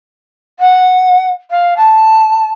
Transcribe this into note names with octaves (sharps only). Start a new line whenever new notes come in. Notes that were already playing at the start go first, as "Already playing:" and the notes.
F#5
F5
A5